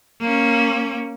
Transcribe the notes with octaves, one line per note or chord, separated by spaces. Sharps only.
A#3 C#4